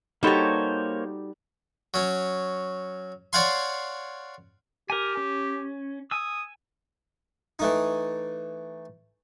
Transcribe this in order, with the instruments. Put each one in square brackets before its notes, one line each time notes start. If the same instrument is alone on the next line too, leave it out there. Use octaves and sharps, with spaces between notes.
[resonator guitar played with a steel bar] G3 F#4 G4 [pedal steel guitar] A#3 C5 C#5 [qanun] D#4 A4
[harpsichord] F#3 C#4
C#5 D5 F5 F#5 G#5 C6
[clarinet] G4 [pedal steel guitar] A#4 G#5
[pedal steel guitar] C#4
[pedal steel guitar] G#5 E6 [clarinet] D#6
[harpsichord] E3 A3 D#4